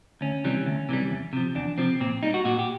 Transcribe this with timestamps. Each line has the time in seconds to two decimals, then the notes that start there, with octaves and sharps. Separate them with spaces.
0.21 D2 C#4
0.44 C3 E3 G3
0.66 D2
0.89 C3 E3 G3
1.11 E2
1.33 C3 F3
1.55 E2 D4
1.78 C3 F3 C4
2.00 A#2 C4
2.23 G3 D#4
2.34 F#4
2.45 A#2 F#4
2.59 G4